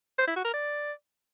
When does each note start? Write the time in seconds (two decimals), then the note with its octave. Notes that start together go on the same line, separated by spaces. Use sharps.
0.18 C5
0.27 E4
0.36 F#4
0.45 A#4
0.53 D5